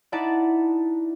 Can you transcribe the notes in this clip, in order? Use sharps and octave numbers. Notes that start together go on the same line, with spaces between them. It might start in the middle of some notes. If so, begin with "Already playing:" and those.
D#4 E4 D5 F#5 A5